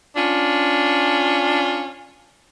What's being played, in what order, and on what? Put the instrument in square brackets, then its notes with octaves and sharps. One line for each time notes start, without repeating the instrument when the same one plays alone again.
[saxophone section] C#4 D4 F4